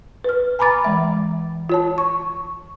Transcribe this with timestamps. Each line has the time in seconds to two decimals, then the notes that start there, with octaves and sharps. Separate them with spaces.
0.24 B4 F6
0.59 G#5 A#5 B5 D6 A6
0.84 E3 G#3 E5
1.70 F4 C#5 A5
1.98 C#6